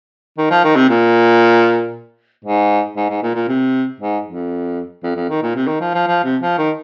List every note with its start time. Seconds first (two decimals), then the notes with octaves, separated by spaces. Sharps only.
0.38 D#3
0.51 F3
0.64 D#3
0.76 C3
0.89 A#2
2.45 G#2
2.97 G#2
3.10 G#2
3.23 A#2
3.35 A#2
3.48 C3
4.00 G#2
4.26 F2
5.04 F2
5.16 F2
5.30 D#3
5.43 A#2
5.56 C3
5.68 D#3
5.81 F3
5.94 F3
6.07 F3
6.24 C3
6.42 F3
6.58 D#3